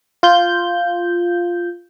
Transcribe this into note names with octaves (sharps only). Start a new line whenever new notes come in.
F4 G6